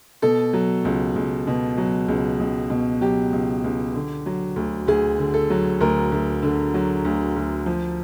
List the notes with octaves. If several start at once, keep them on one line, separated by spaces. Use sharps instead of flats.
B2 A4
F#3
C#2
C#2
B2
F#3
C#2
C#2
B2
F#3 G4
C#2
C#2
D3
F#3
D2
D2 G#4
D3
A4
F#3
D2 A#4
D2
D3
F#3
D2
D2
F3